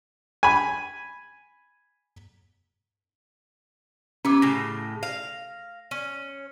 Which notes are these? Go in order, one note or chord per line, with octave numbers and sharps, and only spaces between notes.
G#5 B5
E3 B3 C#4 D6
A2 C#3 A#6
F5
C#4